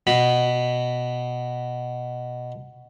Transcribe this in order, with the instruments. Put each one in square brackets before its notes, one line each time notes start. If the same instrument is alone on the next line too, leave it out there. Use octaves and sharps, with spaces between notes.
[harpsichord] B2 B5